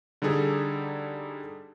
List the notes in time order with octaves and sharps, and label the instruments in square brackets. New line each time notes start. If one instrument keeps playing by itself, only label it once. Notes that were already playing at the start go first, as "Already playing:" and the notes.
[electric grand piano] D3 G3 D#4 G#4 A4